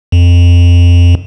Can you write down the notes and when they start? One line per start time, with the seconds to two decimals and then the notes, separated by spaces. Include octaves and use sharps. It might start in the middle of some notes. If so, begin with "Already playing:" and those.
0.12 F2